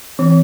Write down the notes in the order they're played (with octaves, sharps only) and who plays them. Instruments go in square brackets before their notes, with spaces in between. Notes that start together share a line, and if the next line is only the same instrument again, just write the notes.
[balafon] E3 [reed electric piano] C4